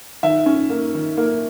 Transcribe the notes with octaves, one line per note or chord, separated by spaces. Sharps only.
D#3 E5
C#4
A#3
D#3
A#3